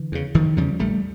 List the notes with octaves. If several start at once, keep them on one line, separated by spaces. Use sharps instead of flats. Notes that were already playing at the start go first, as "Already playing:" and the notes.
Already playing: D3 E3
E2 C#3
F#1 D#3 F3
E2 C#3 F3 G3
A#1 G3 A3